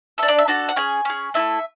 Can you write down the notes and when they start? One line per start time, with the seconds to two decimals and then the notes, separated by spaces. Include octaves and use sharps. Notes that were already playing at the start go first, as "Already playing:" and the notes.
0.18 D4 A4 E5
0.28 D5
0.38 E5
0.48 D4 F#4 A4 A5
0.69 F#5
0.76 C#4 G#4 G#5
1.05 C#4 G#4
1.34 A3 E4 A4 E5